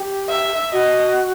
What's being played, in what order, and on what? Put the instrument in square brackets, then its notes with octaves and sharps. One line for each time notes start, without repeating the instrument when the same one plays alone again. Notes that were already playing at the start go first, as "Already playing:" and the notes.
Already playing: [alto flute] G4
[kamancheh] E5
[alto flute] F#4 [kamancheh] D#5